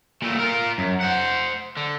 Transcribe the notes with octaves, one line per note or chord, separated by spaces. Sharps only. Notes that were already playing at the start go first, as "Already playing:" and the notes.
A#2 A3
F4 A#4
F#2
C5 F#5
D3